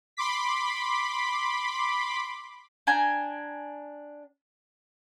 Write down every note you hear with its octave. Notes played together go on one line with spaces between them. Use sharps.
B5 C6 D6 B6
D4 G5 G#5 A#5